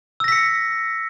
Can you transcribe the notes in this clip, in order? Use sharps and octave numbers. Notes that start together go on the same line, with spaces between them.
E6 A#6 B6 C#7